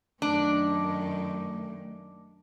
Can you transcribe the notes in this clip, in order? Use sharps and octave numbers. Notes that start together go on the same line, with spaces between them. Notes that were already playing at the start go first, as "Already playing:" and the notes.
F#2 D#3 A3 D4